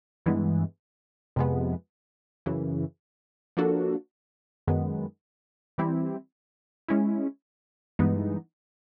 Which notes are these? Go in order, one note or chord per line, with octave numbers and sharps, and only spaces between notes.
G2 E3 G#3 B3
F2 C3 F3 G#3 B3
F#2 C#3 E3
F3 A#3 D4 F#4 A4
F#2 D#3 G#3 B3
E3 G3 C4 E4 G4
G#3 C#4 E4
G2 E3 G#3 B3 D#4